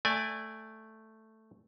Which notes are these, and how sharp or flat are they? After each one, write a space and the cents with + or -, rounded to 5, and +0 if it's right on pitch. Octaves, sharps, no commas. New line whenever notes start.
A3 +0 D5 +0 G#5 -25